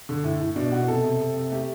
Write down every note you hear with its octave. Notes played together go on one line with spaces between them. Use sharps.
D3
A2
A2
B2 D4
B2 F#4
C3 A4
C3
C3
C3
A3 G4